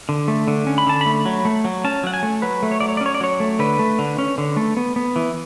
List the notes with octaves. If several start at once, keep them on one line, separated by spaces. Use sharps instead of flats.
D3
A3
D3
C#4
B5
D3 A5
B5
A3
F#3
A3
F#3
C#4 A5
F#3 F#5
G#5
A3
F#3 B4
A3
C#5
F#3 D5
C#5
D5
C#4
C#5
D5
F#3 C#5
A3
D3 B4
A3
D3
C#4
D3
A3
B3
B3
E3